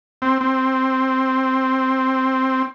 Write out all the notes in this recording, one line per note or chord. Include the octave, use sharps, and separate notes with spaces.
C4
C4